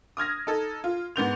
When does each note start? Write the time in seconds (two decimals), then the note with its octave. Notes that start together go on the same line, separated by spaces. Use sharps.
0.17 D#6 F6 G#6 A#6
0.47 D#4 A4
0.84 F4
1.16 G#2 B3 G6 F7